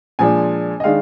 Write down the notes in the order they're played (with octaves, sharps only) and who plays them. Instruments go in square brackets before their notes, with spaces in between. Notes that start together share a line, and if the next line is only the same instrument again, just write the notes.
[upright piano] A#2 F3 G#3 D4 G#5
D#5
D#3 G#3 D4 F5